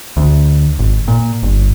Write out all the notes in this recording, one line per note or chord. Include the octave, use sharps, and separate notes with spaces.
D2
G#1
A#2
G1